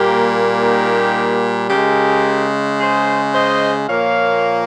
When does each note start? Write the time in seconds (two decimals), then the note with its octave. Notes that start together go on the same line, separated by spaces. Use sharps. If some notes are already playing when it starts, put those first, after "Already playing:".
Already playing: A#2 G3 A#3 G4 A#4
0.61 D#4 G4
1.70 C#3 G#3 G4 A#4
2.80 G#4 C5
3.34 C5 D#5
3.89 A#2 F3 A#3 C#5 F5